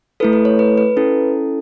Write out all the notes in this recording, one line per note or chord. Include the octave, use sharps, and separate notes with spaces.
A3 E4 A4 B4
B4
C#5
B4
B4
C#4 E4 A4